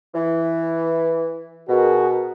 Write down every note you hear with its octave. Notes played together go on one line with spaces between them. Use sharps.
E3
B2 F#4 G#4 A#4